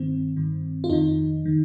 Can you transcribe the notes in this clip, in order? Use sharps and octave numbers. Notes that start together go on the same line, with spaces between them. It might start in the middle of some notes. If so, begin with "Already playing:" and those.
Already playing: G2 D#3 C4
G2 D#3
F4
F2 D#3 D#4
D#3